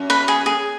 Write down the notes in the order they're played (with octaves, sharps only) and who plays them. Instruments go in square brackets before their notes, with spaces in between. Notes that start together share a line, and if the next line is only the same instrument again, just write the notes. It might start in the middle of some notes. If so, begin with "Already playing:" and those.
Already playing: [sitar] F#2
[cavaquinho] B4
G#4
G#4